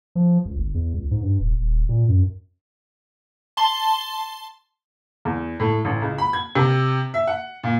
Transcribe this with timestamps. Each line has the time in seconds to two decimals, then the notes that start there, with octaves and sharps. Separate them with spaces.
0.15 F3
0.45 C#2
0.58 G1
0.74 E2
0.94 C#2
1.11 G#2
1.22 G2
1.40 D#1
1.60 D#1
1.89 A#2
2.08 F#2
3.57 A5 C6 G7
5.25 E2
5.60 A2
5.85 A1
6.02 C#2
6.18 B5
6.33 G#6
6.55 C3
7.14 E5
7.27 F#5
7.64 A#2